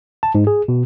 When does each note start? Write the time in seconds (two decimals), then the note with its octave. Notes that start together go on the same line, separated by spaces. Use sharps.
0.23 A5
0.35 G#2
0.47 G#4
0.68 B2